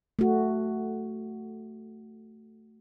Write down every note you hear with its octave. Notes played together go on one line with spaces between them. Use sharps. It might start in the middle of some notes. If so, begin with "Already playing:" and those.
A3 F#4